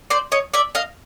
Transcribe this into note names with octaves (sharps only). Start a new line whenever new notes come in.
C5 D5
C#5 D#5
D5 E5
D#5 F5